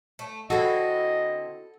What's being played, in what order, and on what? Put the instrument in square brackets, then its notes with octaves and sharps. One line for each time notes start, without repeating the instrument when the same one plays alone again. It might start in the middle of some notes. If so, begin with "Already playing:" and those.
[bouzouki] A3
[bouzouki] D3 C4 E4 [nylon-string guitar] F#4 [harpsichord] A4 [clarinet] D#5